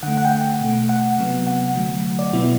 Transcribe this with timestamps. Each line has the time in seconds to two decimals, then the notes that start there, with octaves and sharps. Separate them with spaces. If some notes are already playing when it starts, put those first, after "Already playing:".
0.03 D3 A3 F#5
0.17 F#5
0.25 G5
0.31 F#5
0.61 B2 A3
0.89 F#5
1.18 C3 F#3 B3
1.47 F#5
1.75 D3 F#3 A3
2.19 D5
2.33 B2 F#3 B3 E4